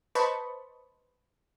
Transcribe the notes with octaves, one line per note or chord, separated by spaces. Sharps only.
B4 C5 D#5 A5 B5 C#6